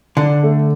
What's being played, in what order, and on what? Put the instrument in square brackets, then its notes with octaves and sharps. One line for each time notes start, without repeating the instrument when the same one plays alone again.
[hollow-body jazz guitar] D3 [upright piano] D4
[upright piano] A3